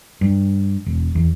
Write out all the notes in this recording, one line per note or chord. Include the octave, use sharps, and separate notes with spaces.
G2
E1
E2